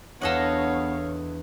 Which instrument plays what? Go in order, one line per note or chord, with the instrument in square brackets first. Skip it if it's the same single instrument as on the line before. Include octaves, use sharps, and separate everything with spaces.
[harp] E2 D4 [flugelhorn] B3 [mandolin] A4 D#5 F#5 [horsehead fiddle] C#5 F5